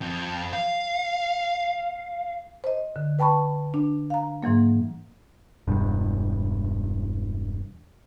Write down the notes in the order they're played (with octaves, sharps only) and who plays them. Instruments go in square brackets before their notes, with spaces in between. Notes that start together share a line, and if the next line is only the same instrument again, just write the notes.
[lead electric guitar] F2
F5
[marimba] C5 D#5
D3
B4 G5 A5 B5 C#6
D4
F5 A#5
G#2 E3 F#3 A#3
[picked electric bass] E1 G2